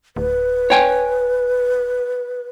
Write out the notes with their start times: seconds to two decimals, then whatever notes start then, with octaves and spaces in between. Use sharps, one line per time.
0.16 D1 B4
0.70 C#5 G5 G#5